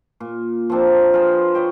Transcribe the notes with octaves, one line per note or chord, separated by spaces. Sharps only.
A#2
F3 A#3 C4 D4
F4 G#4 B4 C5
B4 C#5 D#5 G5